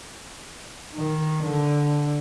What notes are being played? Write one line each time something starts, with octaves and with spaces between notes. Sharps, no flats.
D#3
D3